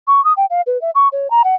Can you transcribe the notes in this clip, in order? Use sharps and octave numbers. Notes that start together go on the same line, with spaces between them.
C#6
D#6
G5
F5
B4
E5
C#6
C#5
A#5
F#5